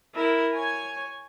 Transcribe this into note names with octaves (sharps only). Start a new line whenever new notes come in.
E4 A#4
C#5 G#5